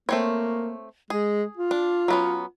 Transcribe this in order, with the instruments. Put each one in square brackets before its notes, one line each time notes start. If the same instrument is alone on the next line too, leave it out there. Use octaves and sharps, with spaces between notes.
[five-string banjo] A3 C4 C#5 [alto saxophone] A#3
[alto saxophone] G#3 [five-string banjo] G#4
[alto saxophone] F4
[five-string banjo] D4
F#3 B3 C#4